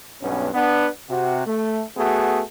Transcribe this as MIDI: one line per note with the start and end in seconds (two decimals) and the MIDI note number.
0.22 0.48 35
0.22 0.48 43
0.22 0.48 59
0.22 0.48 61
0.54 0.88 59
0.54 0.88 62
1.10 1.46 48
1.10 1.46 66
1.47 1.83 57
1.97 2.42 57
1.97 2.42 59
1.97 2.42 66
1.97 2.42 68